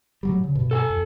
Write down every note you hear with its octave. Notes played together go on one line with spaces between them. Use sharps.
A2 F#3 G3
C#3
G2 B2
A4 G5 G#5
F2